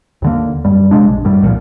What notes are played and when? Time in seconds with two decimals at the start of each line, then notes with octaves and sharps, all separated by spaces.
0.22 D#2 D3 A#3
0.65 F#2 G3
0.91 C3 G#3 D4
1.07 A#1
1.25 F#2 A2 G3
1.42 C2 A#2 D3 F3